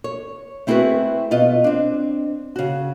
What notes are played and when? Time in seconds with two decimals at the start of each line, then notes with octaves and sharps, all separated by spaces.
0.04 C#5
0.67 A3 C4 E4 F#4 G#4 B4
1.31 B2 F4 D#5
1.64 C4 D4
2.56 C#3 F#4